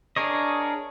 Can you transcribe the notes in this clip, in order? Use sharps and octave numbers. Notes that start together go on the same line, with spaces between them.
D4 G#4 A#4 C#5 D#5